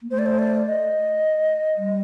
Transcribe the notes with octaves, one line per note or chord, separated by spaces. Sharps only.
A#3
A3 C5
D5
C5
D5
D#5
G3